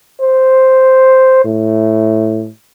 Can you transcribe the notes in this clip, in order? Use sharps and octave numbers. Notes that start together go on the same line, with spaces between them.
C5
A2